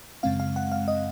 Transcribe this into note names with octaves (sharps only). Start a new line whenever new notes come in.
F#2 C#3 G#3 C4 F5
F5
F#5
F5
D#5